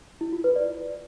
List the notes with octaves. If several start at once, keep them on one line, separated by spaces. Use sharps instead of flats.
E4
F4
B4
D5